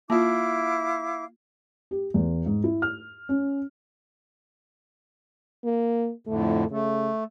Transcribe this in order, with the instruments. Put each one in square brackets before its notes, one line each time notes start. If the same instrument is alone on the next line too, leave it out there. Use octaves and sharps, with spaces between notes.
[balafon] A#3 F4 [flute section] E4 F5 D6
[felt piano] G4
E2
G#2
E4
F6
C#4
[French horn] A#3
[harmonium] F2 A2 D3 [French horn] A3
[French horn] C#3 [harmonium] A3